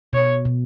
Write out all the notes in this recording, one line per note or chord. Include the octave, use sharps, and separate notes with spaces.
B2 C#5
B2